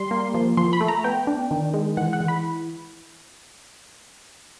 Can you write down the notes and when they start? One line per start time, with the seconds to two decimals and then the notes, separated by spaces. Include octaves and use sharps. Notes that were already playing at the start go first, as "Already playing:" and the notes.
Already playing: G3 C6
0.11 A#3
0.34 F3
0.57 F3 C6
0.73 B5
0.81 A3
0.88 A#5
1.04 B3 G5
1.27 D4
1.51 D#3
1.74 G#3
1.97 E3 F#5
2.13 F#5
2.20 E3
2.28 B5